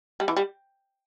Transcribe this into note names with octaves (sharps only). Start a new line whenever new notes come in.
G3
E3
G3